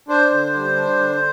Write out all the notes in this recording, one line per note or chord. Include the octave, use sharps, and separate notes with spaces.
D4 C5
D3
G3
D4
D3